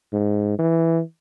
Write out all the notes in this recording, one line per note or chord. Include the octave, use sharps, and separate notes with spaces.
G#2
E3